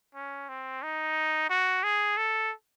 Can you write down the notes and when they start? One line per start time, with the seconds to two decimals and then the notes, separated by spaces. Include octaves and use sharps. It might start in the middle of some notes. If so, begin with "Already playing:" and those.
0.15 C#4
0.49 C4
0.83 D#4
1.49 F#4
1.84 G#4
2.17 A4